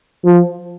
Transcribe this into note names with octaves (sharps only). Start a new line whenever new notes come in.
F3